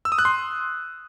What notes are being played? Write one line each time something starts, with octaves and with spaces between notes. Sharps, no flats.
E6
D#6
F#6
C6